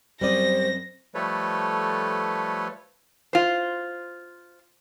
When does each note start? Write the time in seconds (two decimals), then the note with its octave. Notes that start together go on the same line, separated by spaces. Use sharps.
0.21 C2 F#2 G3 C5 D5 D#5 A#6
1.15 F3 G3 A3 A4 B4 C#5
3.33 F4 C5